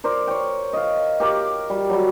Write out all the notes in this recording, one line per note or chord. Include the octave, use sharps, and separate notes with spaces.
A#4 C5 D5
C#5 G5
D#5 F5
G4 A#4 D6
G3
F#3 G3